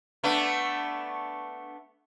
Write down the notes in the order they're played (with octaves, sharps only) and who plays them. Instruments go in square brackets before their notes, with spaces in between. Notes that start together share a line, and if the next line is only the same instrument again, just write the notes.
[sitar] A3 B3 D4